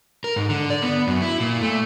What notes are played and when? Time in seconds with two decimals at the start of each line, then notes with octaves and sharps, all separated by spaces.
0.24 A#4
0.36 G#2
0.49 D3
0.70 D5
0.82 B3
1.07 F#2
1.22 E4
1.40 A#2
1.61 A3